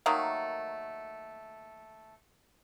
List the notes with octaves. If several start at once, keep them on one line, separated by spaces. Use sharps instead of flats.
D#3 F#3 A3 A#3